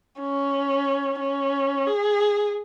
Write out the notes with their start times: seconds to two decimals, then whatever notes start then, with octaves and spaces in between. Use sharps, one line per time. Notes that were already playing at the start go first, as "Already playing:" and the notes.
0.20 C#4
1.20 C#4
1.88 G#4